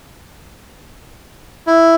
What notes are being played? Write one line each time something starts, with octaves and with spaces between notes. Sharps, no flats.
E4